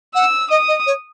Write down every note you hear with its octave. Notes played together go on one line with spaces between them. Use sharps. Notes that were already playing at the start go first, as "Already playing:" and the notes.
F#5 E6
D#5 D#6
D#5
C#5